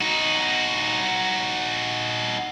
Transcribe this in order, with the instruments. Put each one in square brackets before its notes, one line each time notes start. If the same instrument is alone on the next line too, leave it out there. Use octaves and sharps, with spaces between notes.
[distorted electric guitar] D#4 F#4